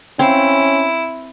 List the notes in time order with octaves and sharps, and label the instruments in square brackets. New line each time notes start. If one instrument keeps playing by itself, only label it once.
[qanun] C4 F5 [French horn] C#4 [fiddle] E4